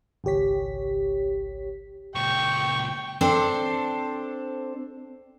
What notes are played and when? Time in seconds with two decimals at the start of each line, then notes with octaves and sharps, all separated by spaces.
0.24 G#1 C#2 G4 C#5 B6
2.15 C#2 A#2 G5 C#6
3.21 C4 D4 A4 C5